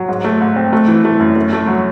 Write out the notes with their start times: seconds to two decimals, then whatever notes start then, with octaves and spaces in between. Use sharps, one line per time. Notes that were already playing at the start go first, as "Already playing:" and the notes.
Already playing: F#3
0.08 G#2
0.24 A3
0.41 G#2
0.56 C4
0.73 A3
0.88 E3
1.05 A3
1.20 F#2
1.36 A3
1.53 A3
1.68 F#3